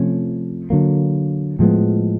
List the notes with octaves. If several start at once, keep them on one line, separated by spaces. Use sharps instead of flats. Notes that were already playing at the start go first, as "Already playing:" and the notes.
Already playing: C3 F3 A3 C#4
D3 F#3 A#3
A2 F3 G#3 B3